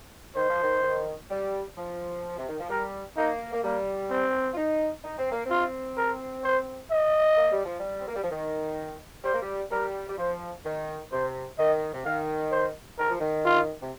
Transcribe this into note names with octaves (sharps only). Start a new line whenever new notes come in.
D#3 C5
F3
D#3
D#3
G3
F3
C3
D#3
F3
G3 A#4
A#3 D#4
A#3
G3 A#3
C4
F4
D#4
D#4
C4
A#3
C4
F4
A#4
C5
D#5
A#3
G3
F3
G3
C4
A#3
G3
F3
D#3
G3 C5
A#3
G3
G3 A#4
G3
F3 C5
D#3
C3 C5
D#3 D#5
C3
D#3 F5
C5
D#3 A#4
F3
D#3
F4
C3